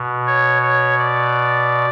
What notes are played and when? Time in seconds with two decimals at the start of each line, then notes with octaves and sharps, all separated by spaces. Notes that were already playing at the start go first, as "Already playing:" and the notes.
Already playing: B2
0.27 C#5
0.62 C#5
0.98 D5